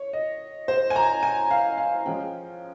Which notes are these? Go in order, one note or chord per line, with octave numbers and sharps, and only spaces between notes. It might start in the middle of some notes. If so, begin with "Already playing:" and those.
Already playing: C#5
D#5
C5
G#5
A#5
G#5
F5
F5
F3 G#3 C#4 G5